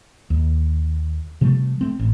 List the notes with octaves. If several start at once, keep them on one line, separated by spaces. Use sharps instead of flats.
D#2
C3 F3 G3 A3
A3 C4
A1